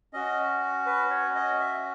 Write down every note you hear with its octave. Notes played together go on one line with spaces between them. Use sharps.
C#4 F#4 D#5
B4
C#5
D#5
E5